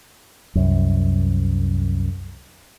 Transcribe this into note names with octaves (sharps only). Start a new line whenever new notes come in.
C2 F#2